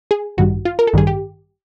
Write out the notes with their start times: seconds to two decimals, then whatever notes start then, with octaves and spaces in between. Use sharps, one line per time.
0.11 G#4
0.37 A1 G2 D#3 G3 F#4
0.65 F4
0.79 A#4
0.87 A4
0.93 A1 G2 D#3 G3 G#4
1.07 G4